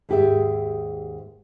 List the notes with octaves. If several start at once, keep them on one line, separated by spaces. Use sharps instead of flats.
D#2 G#2 G4 G#4 E5